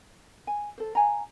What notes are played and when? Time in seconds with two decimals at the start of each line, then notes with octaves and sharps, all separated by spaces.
0.47 G#5
0.78 A4 C5
0.95 F5 G#5 A#5